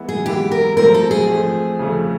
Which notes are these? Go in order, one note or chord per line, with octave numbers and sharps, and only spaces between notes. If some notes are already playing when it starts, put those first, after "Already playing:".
Already playing: E3 G#3 B3 E4
G#4
E3 G#3 B3 E4 G4
A#4
F3 A3 C4 A#4
A4
G#4
F3 A3 C4
F2 C#3 F3 A3